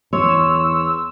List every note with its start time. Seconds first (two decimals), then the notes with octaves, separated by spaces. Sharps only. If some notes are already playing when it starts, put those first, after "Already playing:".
0.13 E2 C#5 C6 E6